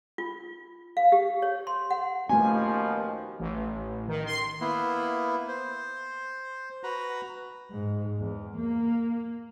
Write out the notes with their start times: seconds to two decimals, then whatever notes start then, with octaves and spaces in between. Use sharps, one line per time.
0.18 F4
0.97 F5
1.12 G4
1.42 C#5
1.67 C6
1.91 F#5
2.29 D#2 B2 F3 A3 C#4 G#5
3.39 A1
4.08 D#3
4.26 C6
4.61 A#3 B3 E4
5.48 C5
6.83 F#4 B4 A#5
7.70 G#2
8.19 E2
8.58 A#3